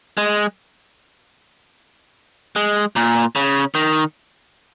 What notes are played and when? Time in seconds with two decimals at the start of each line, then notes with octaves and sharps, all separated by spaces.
0.18 G#3
2.56 G#3
2.96 A#2
3.36 C#3
3.75 D#3